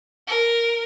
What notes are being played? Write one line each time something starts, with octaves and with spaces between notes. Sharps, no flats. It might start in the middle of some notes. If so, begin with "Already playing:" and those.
A#4